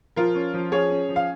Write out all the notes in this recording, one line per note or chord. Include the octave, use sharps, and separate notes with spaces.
F3 F4 A#4
C#4
F3
C#4 G#4 C#5
C#4
F3
F5